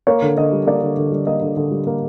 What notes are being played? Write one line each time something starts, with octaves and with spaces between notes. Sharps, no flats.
A#3 C#5
D3
D3 D#5
G3
A#3 D5
D3
D3
G3
A#3 D#5
D3
D3
G3
A#3